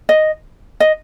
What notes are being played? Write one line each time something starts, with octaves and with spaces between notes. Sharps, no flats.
D#5
D#5